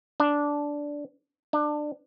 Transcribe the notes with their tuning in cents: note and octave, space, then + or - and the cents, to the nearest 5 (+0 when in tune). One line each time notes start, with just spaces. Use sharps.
D4 -10
D4 +20